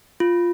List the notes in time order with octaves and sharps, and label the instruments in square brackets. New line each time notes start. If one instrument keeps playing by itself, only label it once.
[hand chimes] F4